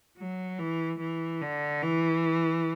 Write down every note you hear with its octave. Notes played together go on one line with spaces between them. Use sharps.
F#3
E3
E3
D3
E3